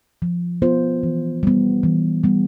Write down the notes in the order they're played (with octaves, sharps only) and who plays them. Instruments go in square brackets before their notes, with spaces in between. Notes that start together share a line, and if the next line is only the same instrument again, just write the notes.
[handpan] F3
B3 F4 C5
E3
G3 B3
E3
G3 B3